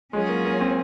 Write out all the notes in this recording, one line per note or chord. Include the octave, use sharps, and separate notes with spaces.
F#3 G#3 C#4 F4 G#4 C#5
A#3
A#3
C4